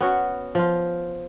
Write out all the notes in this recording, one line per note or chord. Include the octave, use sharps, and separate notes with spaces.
B3 C#4 F#4
F3 F4